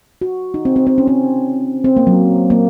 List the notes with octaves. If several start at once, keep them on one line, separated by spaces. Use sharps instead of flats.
F#4
D#4
C4
C4
C4
C#4
C4
C4
A#3
F#3
A#3